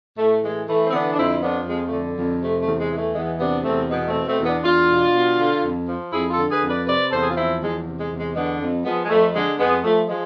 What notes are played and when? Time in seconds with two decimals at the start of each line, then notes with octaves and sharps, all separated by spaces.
0.18 A2 A3
0.43 E3 G#3
0.67 E3 A3
0.87 C4
0.92 D3 B3 D4
1.14 D4
1.17 F2 C4 E4
1.42 F3 B3 D4
1.66 F2 G#3
1.85 A3
1.92 D3
2.17 F2
2.41 C3 A3
2.60 A3
2.66 E2
2.79 G#3
2.90 E3
2.96 A3
3.15 E2 G#3 B3
3.40 C3 B3 D4
3.65 E2 A3 C4
3.90 B2 G#3 B3
4.08 A3 C4
4.15 B2
4.27 A3 C4
4.39 E2
4.45 B3 D4
4.64 E2 D4 F4
4.89 B2
5.14 B2
5.38 D3
5.63 F2
5.88 F3
6.12 F2 E4 G#4
6.31 F4 A4
6.38 D3
6.50 G#4 B4
6.62 F2
6.68 B4 D5
6.87 C3 B4 D5
7.11 E2 A4 C5
7.22 G#4
7.29 F4
7.36 F3 C4 E4
7.61 E2 G#3
7.86 C3
7.98 G#3
8.11 E2
8.17 G#3
8.35 D3 G#3 B3
8.60 F2
8.85 F3 G#3 B3
9.05 G#3
9.09 F2 A3
9.34 D3 G#3
9.59 F2 G#3 B3
9.84 F3 A3
10.09 F3 G#3